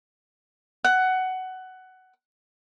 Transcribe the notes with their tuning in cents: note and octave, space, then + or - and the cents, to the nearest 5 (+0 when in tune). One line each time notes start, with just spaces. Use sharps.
F#5 +15